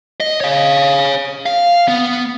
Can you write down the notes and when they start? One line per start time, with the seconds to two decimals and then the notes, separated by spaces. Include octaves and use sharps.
0.20 D#5
0.41 C#5 F5
1.46 F5
1.88 B3